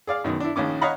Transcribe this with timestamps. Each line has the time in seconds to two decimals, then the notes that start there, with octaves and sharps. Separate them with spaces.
0.07 G#4 D5 F5
0.24 F#2 B2 D#3
0.40 D4 E4
0.56 A#1 D#3 C#4 D6
0.81 C#5 D#5 F5 F#5 A#5 B5